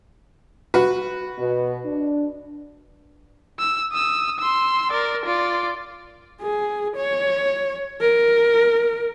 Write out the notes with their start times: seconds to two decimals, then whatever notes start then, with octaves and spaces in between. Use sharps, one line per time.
0.74 F#4 B4
1.39 B2
1.85 D4
3.59 E6
3.92 D#6 E6
4.39 C6 E6
4.91 A#4 D5
5.26 F4 D5
6.41 G#4
6.96 C#5
8.01 A#4